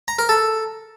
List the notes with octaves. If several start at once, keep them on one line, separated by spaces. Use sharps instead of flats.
A#5
A#4
A4